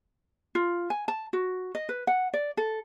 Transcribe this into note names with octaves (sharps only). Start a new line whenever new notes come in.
F4
G#5
A5
F#4
D#5
B4
F#5
D5
A4